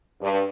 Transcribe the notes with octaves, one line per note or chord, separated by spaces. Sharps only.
G2